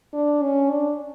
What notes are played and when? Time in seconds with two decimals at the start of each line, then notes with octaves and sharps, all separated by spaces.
0.13 D4
0.42 C#4
0.70 D4